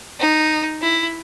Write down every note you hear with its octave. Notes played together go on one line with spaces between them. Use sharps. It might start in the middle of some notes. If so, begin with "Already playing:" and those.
D#4
E4